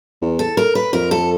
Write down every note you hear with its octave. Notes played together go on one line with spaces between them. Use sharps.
E2
A4
A#4
B4
F2 A#4
A4